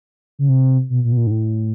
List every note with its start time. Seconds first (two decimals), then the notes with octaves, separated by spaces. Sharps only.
0.39 C#3
0.49 C3
0.90 B2
1.04 A#2
1.12 B2
1.17 A#2
1.27 G#2
1.31 A2